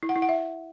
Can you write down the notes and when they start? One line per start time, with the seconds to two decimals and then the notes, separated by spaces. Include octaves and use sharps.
0.03 E4
0.09 F#5
0.16 E4
0.22 F#5
0.29 E5